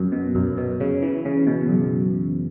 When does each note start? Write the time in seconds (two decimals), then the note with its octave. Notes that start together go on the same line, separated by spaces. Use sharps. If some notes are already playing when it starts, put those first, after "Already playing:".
Already playing: F#2
0.12 B2
0.35 F#2
0.57 B2
0.80 C#3
1.02 E3
1.25 C#3
1.47 B2
1.69 F#2